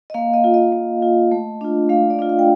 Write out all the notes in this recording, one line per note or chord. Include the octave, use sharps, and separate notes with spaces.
D#5
A#3 F5
D#5
F4
D#5
A#3
F4
A3
D4 F4
A3 F5
D5
D4 F4 D#5
F5
G5